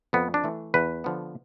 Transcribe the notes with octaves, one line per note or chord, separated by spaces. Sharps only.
F2 B3
D4
E3 A3
E2 B4
D3 F3 B3